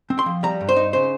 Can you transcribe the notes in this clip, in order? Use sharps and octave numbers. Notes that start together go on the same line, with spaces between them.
C4
C6
F3
G3 A#5
G2
C5
D#4
C#3 C5